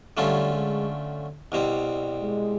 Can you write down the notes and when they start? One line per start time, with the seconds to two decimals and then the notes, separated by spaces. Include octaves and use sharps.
0.17 D3 F#3 G3 A3 C#4 F4
0.51 G#3
1.52 C2 B2 G3 C4
2.19 G#3